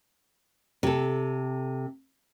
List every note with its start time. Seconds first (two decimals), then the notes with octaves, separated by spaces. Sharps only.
0.83 C3 A4